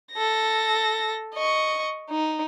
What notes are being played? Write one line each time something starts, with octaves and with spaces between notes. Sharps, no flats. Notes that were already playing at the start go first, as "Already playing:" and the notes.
A4 A#6
D#5 C#6
D#4